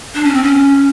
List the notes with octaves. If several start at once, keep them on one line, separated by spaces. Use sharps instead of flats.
D4
C#4
C4
C#4